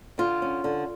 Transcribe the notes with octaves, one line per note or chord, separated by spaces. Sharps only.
D3 F4
C#4
D3